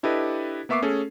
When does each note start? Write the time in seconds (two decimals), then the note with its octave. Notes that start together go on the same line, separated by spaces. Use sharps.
0.03 D4 E4 G4 A4 B4 D#5
0.69 A#3 B3 E5 C#6 D6 C7
0.82 A3 C#4 G#4 A4